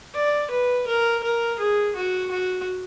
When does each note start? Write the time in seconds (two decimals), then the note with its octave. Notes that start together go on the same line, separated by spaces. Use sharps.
0.15 D5
0.50 B4
0.87 A#4
1.23 A#4
1.59 G#4
1.95 F#4
2.31 F#4